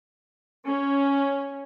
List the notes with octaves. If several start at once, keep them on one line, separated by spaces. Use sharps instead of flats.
C#4